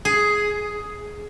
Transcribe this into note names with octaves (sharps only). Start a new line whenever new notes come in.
G#4